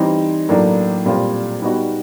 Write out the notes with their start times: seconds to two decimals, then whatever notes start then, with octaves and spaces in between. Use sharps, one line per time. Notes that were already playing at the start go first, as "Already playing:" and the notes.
Already playing: E3 G3 C4 D#4
0.49 A2 F#3 A#3 D4
1.06 A#2 G3 C4 F4
1.62 G3 B3 D#4 F#4